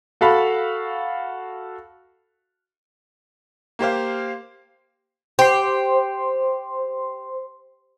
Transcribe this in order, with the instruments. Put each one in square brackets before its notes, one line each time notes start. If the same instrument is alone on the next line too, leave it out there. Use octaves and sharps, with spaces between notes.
[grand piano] F#4 A4 F5 B5
[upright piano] A#3 G4 C5 F5
[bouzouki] G4 [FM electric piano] C5 C6